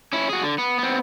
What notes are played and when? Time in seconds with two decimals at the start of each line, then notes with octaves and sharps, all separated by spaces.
0.13 C#4 E4
0.29 F#4 G#4
0.43 D3
0.58 B3
0.79 B3 C4